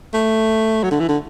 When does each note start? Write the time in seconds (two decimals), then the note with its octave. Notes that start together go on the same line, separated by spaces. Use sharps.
0.14 A3
0.83 F#3
0.91 D3
1.00 E3
1.09 D3